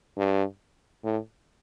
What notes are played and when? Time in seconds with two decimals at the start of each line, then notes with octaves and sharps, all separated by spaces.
0.17 G2
1.04 A2